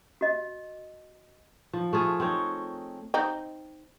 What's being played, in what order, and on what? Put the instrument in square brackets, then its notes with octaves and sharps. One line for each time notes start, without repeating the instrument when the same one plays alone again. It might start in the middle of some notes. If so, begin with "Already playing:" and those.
[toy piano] F#4 D#5
[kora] F3
A3 F4 G#4
C4 D#4 C#5
[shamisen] C4 D#4